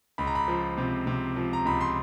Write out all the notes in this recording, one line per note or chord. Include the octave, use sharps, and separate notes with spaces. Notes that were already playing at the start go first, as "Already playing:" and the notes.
C#2 B5
A#5
B5
F3
C3
C3
F3
A#5
C#2 B5
C6